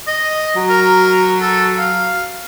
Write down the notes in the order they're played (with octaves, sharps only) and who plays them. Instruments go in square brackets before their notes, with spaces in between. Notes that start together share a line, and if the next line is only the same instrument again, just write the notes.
[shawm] D#5
[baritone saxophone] F#3
[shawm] A#4
A4
F5